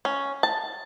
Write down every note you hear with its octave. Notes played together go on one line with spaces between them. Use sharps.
C#4
A5